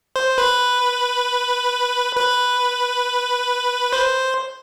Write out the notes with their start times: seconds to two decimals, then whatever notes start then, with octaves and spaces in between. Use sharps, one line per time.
0.16 C5
0.38 B4
2.16 B4
3.93 C5